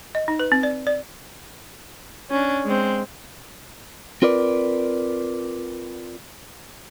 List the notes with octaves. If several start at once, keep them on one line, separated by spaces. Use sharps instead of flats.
D#5
D#4
B4
C4
D5
D5
C#4 D4
G#3 C4
C4 F4 A#4 B4 D5